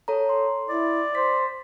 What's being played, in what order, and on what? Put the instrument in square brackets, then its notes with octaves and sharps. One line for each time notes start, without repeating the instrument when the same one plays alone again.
[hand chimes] A4 C#5 A#5
C6
[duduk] E4 [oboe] D5
[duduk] C5 [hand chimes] B6